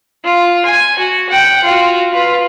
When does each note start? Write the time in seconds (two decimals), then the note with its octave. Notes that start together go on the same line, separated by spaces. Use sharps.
0.25 F4
0.65 G#5
0.99 F#4
1.29 F#5 G5
1.64 F4 F#4
2.13 F4 B4